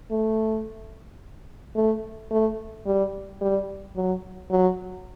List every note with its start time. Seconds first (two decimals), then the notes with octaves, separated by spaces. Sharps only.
0.11 A3
1.76 A3
2.31 A3
2.86 G3
3.41 G3
3.96 F#3
4.51 F#3